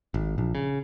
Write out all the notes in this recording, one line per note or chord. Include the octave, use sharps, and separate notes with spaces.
G#1
A#1
C#3